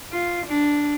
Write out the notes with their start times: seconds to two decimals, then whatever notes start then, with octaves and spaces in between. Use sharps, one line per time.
0.12 F4
0.46 D4